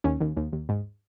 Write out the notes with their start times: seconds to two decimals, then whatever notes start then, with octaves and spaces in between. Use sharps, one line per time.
0.04 D#2 C#4
0.21 D#2
0.37 D#2
0.53 D#2
0.69 G#2